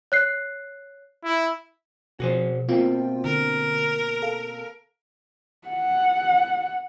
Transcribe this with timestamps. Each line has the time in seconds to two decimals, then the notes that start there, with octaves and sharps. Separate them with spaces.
0.12 C#5 F#6 C7
1.24 E4
2.20 B2 F3 F#4 G#4 C5
2.69 B2 A#3 C4 F4 G5
3.24 D3 A#4
4.22 A4 F5
5.68 F#5